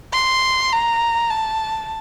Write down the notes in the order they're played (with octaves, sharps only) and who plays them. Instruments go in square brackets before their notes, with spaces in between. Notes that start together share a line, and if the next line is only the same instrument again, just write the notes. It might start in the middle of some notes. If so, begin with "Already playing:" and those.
[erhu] C6
A#5
A5